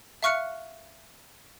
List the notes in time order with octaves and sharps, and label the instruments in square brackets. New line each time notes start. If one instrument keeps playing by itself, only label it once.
[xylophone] E5 F5 C#6 F6 F#6 C#7